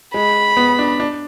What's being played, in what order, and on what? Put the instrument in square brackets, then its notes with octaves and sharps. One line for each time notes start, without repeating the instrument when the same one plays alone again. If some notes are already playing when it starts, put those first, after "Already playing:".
[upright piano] G#3 [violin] B5
[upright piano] B3
D4
D4